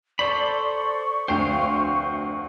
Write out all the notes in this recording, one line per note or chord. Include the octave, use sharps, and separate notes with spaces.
A4 C5 D5 B5 C#6
F1 D2 C5 F5 G5